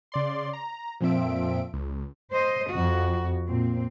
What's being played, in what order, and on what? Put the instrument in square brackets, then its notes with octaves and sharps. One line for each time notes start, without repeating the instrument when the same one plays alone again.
[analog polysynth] C#3 D5 C6
A#5
F2 A#2 F3 C4 E5 D7
C#2
[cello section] C5 D#5
[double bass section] F2 [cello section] F#4
[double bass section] A#2 [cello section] C4